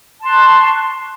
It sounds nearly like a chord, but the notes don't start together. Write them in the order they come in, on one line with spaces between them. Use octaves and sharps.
A5 C6 F#6 C#6